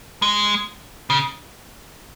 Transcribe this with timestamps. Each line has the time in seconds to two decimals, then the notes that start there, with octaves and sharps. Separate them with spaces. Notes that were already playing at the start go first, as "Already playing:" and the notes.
0.22 G#3
1.10 C#3